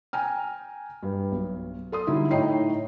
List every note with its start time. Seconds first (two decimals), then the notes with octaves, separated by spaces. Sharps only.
0.13 G5 G#5 A#5 F6
1.03 G2
1.32 B1
1.92 A4 C6 D#6
2.07 D3 F#3 G3 D#4 E4 G4
2.31 A2 D#4 C#5 D#5 G5 C7